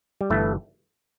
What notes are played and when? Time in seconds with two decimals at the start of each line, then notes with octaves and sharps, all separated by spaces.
0.21 G3
0.30 G1 G2 E3 A3